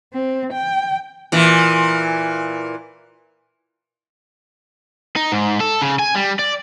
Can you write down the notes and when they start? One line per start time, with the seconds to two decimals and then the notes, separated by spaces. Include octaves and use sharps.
0.14 C4
0.53 G5
1.32 A#2 E3
5.16 D#4
5.32 G#2
5.60 A4
5.82 C#3
5.99 G#5
6.15 G3
6.39 D5